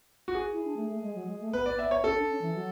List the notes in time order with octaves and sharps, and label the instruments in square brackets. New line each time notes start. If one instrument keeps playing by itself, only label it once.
[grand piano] F#4
G#4
[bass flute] E4
D4
A3
A3
G#3
F#3
G#3
A3
[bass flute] B3 [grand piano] B4
[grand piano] D5
[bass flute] B3 [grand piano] E5
[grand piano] C#5
[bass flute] C#4 [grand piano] A4
[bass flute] D4
C#4
E3
F#3